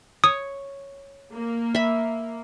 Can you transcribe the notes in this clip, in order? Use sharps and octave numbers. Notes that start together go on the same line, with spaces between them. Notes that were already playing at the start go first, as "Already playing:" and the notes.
C#5 D#6
A#3
E5 B5